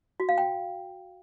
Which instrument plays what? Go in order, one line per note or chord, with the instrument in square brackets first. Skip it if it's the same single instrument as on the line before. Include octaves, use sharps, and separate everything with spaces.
[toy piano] F#4
F5
G5